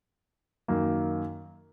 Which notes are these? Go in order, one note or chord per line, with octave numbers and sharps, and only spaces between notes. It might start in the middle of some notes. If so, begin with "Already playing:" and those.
F#2 D#3 A#3